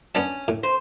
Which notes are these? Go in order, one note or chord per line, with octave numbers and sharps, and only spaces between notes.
B3 C#4 D4 A5
A2
C5